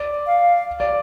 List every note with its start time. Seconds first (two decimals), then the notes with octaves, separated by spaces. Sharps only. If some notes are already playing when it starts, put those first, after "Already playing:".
Already playing: D5
0.27 F5
0.80 D5